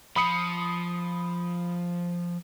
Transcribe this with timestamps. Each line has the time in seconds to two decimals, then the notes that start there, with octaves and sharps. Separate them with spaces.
0.16 F3 B5 D#6 C#7